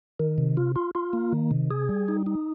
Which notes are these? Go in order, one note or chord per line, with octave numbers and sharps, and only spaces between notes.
D#3
C3
F4
F4
F4
A#3
D#3
C3
G#4
G3
D#4
D#4